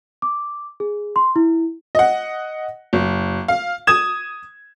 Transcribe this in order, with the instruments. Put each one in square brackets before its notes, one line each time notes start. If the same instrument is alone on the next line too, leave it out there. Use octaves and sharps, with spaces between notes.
[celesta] D6
G#4
C6
E4
[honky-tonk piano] D#5 F#5
F#1
F5
D#6 G#6 E7